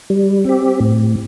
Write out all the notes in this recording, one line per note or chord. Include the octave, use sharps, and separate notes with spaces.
G3
C4 G4
A2